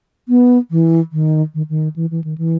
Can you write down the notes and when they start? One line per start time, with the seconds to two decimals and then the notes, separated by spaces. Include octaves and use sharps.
0.29 B3
0.71 E3
1.13 D#3
1.55 D#3
1.70 D#3
1.96 E3
2.11 E3
2.24 D#3
2.38 E3